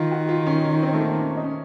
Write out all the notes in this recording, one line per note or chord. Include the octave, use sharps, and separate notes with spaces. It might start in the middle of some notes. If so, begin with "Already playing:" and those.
Already playing: D#3 F4
F#4
F4
C#4
C4
A3
A#3
C#4
D#4
C#4